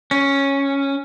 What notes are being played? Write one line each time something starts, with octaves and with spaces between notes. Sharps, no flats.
C#4